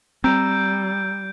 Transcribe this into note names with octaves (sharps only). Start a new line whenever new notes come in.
G3 C4 A#5 E6 G6 D7